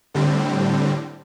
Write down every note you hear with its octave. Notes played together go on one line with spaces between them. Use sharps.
A2 D3 G3 C4